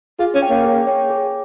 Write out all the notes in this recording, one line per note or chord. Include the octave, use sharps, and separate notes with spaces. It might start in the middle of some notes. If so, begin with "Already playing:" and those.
F4 G#4
C#4
C#5 G5
A#3
G#4
C#5 G5
G#4